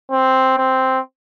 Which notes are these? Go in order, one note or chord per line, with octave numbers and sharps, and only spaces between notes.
C4
C4